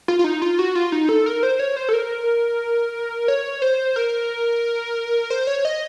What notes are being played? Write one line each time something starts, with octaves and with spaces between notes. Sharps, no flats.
F4
F4
D#4
F4
F#4
F4
D#4
A4
A#4
C5
C#5
C5
A4
A#4
C#5
C5
A#4
C5
C#5
D#5